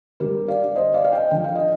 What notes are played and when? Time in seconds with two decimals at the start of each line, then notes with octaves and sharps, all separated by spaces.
0.20 D3 G3 G4 A#4
0.48 D5 F5
0.75 C5 D#5
0.94 D5 F5
1.05 F5
1.13 D#5 G5
1.31 D3 F3 G5
1.44 F5
1.55 D#5